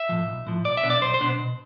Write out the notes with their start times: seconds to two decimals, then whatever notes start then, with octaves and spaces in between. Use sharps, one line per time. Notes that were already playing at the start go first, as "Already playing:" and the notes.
Already playing: E5
0.09 A2 F3
0.28 B1
0.47 A2 F3
0.64 B1 D5
0.77 E5
0.83 B2 B3 D4
0.90 D5
1.02 B1 C5
1.14 C5
1.21 B2 B3 D4
1.39 B2